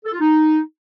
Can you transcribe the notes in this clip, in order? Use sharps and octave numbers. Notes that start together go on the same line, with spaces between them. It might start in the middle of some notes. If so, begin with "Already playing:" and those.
A4
F4
D#4